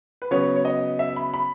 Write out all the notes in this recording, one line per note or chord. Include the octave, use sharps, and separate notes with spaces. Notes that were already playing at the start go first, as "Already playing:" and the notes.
B4
C#3 F#3 B3 C#5
C#5
D#5
E5
B5
B5